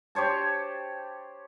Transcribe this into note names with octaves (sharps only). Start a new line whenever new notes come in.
G4 C5 C#5 A5